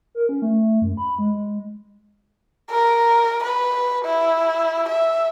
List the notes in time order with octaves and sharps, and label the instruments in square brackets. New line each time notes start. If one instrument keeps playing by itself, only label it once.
[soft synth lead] A#4
C#4
A3
F#2
B5
G#3
G#3
[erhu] A#4
B4
E4
E5